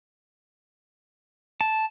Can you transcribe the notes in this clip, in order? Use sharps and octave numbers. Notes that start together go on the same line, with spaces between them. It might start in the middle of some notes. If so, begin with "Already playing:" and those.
A5